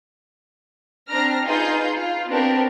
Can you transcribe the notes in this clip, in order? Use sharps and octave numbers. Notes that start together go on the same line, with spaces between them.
C4 D4 A#5 F6 A#6
D#4 F4 G#4 B4 C6 G6
F4
B3 C4 D4 F#4 G4 A#4